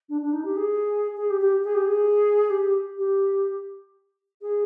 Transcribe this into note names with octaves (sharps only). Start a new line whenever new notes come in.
D4
D4
D#4
G4
G#4
G#4
G4
G4
G#4
G4
G#4
G4
G4
G#4